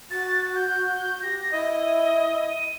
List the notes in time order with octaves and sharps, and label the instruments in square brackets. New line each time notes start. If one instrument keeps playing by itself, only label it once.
[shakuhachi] F#4 [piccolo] A6
[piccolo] G6
[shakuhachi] G4 [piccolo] A#6
[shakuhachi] E4 [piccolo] D#5
[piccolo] D#7